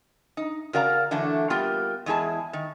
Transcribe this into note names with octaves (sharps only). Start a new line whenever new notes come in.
D#4
C#3 F#4 A#4 D5 F5 A#5
D3 E3 F#3 A3 D4
G3 A#3 B3 F4 G4
E2 G#3 E4 G#4 A5
D#3